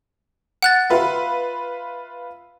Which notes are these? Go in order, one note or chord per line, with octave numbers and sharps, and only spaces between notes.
F#5 F#6 A6
F4 B4 E5